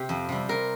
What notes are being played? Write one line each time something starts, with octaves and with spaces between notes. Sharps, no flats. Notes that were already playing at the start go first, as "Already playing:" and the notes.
Already playing: C3 G4
F2
C3 G3
C3 A#4